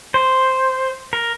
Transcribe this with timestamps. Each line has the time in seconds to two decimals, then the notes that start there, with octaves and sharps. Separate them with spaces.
0.14 C5
1.13 A#4